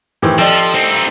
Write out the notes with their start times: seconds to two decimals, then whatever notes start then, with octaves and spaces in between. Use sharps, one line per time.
0.22 A2 D#3 E3 C4 G4
0.38 F3 A4 D5 D#5 G5
0.75 C4 D#4